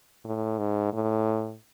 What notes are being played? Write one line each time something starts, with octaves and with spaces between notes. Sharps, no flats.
A2
G#2
A2